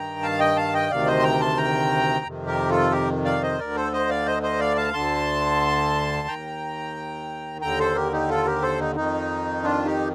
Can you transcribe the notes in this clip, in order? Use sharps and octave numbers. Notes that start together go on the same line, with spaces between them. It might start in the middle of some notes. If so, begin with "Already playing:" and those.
Already playing: G2 D#3 G5 A#5
F5 A5
D#5 G5
F5 A5
D#5 G5
D2 C3 D#3 D5 F5
C5 D#5
C6
G5 A#5
A5 C6
G5 A#5
F2 C3 D#3
G4 A#4
F4 A4
G4 A#4
D5 F5
C5 D#5
D2 D3 A#4 D5
A4 C5
C5 D#5
D5 F5
C5 D#5
C5 D#5
D5 F5
F5 A5
D2 D3 A5 C6
D#2 D#3 G5 A#5
D#2 D3 G5 A#5
A4 C5
G4 A#4
D#4 G4
F4 A4
G4 A#4
A4 C5
D#4
F2 D#3 D#4
D4 F4
D#4 G4